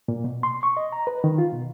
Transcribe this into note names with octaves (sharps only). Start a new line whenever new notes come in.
A#2
B2
C6
C#6
D#5
A#5
B4
D#3
F4
B2